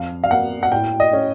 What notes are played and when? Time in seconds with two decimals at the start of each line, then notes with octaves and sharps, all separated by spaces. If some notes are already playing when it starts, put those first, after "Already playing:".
Already playing: F2 F5
0.24 F5
0.31 A#3 F#5
0.63 F#5
0.72 A2 G5
1.00 D#5
1.13 C#4